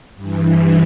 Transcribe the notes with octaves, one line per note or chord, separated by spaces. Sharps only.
G2 E3